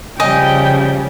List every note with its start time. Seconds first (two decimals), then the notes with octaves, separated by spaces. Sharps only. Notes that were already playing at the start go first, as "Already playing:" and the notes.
0.20 C#3 F3 G3 D#5 G5 G#5